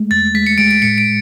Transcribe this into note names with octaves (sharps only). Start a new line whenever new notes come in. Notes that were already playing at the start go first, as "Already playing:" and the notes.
Already playing: G#3 A3
E2 A6
G#3 B6
C#7
G#3 D7
D7
A2 C#7
D7